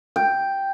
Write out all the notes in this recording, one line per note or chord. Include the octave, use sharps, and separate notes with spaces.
G5